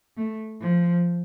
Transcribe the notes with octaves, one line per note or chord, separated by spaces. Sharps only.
A3
F3